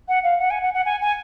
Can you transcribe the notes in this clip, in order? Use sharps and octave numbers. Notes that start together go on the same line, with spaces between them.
F#5
F5
F#5
G#5
F#5
F#5
G#5
G#5